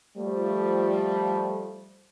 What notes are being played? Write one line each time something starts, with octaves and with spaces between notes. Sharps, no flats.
F3 G3 A3